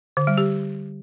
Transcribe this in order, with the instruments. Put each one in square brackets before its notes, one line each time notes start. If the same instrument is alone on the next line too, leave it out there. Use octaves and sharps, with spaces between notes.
[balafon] D3
G3
G4